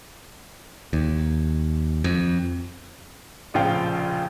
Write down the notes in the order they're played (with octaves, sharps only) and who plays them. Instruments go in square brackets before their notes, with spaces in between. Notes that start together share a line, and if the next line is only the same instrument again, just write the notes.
[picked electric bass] D#2
F2
[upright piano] F1 A#1 C#3 F3 F5 G5